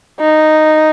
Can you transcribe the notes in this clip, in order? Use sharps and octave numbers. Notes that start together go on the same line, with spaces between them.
D#4